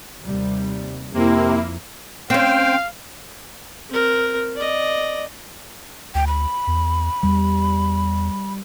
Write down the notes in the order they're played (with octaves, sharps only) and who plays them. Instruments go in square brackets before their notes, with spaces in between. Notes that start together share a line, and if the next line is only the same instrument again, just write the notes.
[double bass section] D#2 C3 G3
[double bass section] F2 [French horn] C3 [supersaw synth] A#3 E4
[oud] C4 C#4 [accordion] C5 G5 [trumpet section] F5
[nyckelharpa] C4 A#4
D5 D#5
[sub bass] D2 [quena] G5
[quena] B5
[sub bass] E2
[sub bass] E2 [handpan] G3